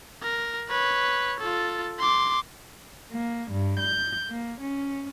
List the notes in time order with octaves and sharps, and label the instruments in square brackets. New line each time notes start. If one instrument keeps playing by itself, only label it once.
[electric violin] A#4
B4 C#5
F4 A4
C6 D6
[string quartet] A#3
G2
G6
A#3
C#4